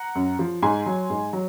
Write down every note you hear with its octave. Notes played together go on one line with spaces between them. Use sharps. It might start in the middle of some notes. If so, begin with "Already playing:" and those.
Already playing: F#5 A#5
F#2
F3
G#2 G#5 C6
F#3
G#2
F#3